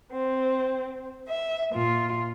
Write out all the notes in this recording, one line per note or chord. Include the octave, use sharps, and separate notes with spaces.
C4
E5
A#2 F4